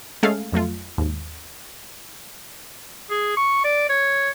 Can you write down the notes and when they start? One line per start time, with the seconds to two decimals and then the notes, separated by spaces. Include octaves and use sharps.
0.23 G#3 A3 C#4 G#4 A4 F5
0.52 F2 F#3 A3 F4
0.98 D#2 G#2
3.10 G#4
3.37 C#6
3.64 D5
3.89 C#5